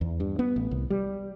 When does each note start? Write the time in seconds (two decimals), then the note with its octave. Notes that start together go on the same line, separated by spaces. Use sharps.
0.01 E2
0.20 G2
0.39 B3
0.56 A1
0.71 C2
0.90 G3